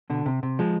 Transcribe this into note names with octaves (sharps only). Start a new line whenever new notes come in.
B2 D3
C3
C3
F3 G#3